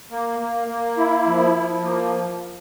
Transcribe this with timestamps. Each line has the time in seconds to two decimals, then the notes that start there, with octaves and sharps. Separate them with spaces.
0.11 A#3
0.39 A#3
0.68 A#3
0.97 E4
1.27 F3
1.55 F3
1.84 A#3